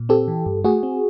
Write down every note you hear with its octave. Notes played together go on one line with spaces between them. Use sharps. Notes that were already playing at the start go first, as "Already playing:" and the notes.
Already playing: A#2
C4 G4 A4
E3
G2
A3 F#4 G#4
C4